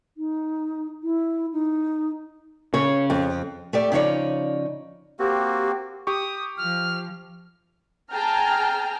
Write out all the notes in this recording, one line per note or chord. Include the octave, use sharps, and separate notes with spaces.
D#4
E4
D#4
C#3 C#5
F2
A3 G4 D5
C#3 F3 D#4 C#5 D5
A#3 C4 F#4 G4
G4 C#6 D#6
F3 F6
G#4 G5 A5 A#5 F6